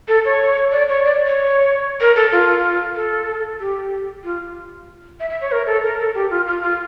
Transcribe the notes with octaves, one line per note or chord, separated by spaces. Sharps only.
A4
C#5
D5
C#5
D5
C#5
A#4
A4
F4
A4
G4
F4
E5
E5
C#5
A#4
A4
A#4
A4
G4
F4
F4
F4